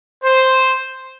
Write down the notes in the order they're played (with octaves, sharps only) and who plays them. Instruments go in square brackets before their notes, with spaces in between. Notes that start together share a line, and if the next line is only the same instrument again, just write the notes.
[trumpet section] C5